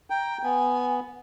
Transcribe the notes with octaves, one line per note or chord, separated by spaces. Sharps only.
G5 A#5
B3 G#5